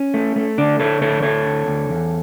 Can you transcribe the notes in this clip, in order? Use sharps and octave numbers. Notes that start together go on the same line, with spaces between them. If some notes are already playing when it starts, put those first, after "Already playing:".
Already playing: C#4
A3
A3
D3 D4
D3 A4 C#5
D2 A4 C#5
D2 A4 C#5
D3
D2
E2